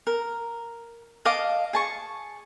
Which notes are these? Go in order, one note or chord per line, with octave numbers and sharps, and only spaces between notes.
A#4
D#5 F5 A5 D6
G#4 A5 C#6